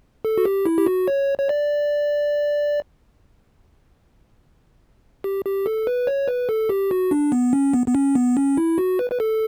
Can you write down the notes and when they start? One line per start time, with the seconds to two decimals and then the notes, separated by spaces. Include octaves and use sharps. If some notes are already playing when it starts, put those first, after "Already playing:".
0.25 A4
0.38 F#4
0.45 G4
0.66 E4
0.78 G4
0.86 F#4
1.08 C#5
1.39 C#5
1.49 D5
5.24 G4
5.45 G4
5.66 A4
5.87 B4
6.07 C#5
6.28 B4
6.49 A4
6.69 G4
6.91 F#4
7.11 D4
7.32 B3
7.53 C#4
7.74 B3
7.88 B3
7.95 C#4
8.15 B3
8.37 C#4
8.57 E4
8.78 F#4
8.99 B4
9.12 B4
9.20 A4